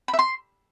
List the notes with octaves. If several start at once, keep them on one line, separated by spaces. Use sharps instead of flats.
B5
E5
C6